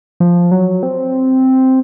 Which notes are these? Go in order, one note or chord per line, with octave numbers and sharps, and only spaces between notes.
F3
F#3
C4